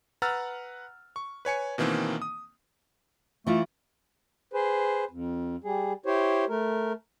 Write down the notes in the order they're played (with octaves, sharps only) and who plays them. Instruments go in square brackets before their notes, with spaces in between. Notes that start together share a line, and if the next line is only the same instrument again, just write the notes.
[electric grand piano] B4 F#5 A#5 E6 F6 A6
C#6
B4 C#5 G#5 C#7
B2 D#3 E3 A#3 C4
D#6
[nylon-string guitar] E3 E4 F4 [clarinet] A3
[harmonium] G#4 B4 C5
F2
G3 G#4
E4 G4 C5 C#5
A3 A#4